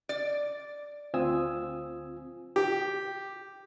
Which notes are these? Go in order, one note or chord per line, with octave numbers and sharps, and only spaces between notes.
D5
D2 C4 F4 G#5 D#6 E6
G4